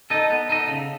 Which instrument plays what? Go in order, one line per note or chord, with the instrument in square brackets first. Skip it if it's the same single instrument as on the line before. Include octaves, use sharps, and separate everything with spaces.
[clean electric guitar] D#4 A4 D#5
B3
D#4 A4 D#5
C#3